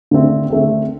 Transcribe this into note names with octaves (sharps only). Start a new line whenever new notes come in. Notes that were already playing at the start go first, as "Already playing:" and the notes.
D3 A3 C4
D3 A3 C4